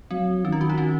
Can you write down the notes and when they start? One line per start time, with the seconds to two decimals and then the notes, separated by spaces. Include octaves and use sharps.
0.11 F#3 C4
0.44 D#3 C#4
0.52 F4
0.61 F#4
0.70 D#4
0.78 C#4